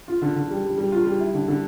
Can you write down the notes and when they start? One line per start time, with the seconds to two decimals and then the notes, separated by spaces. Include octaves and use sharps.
0.08 F4
0.22 D3
0.36 D3
0.50 G3
0.64 G3
0.78 G3
0.92 F4
1.06 G3
1.20 E4
1.34 D3
1.48 D3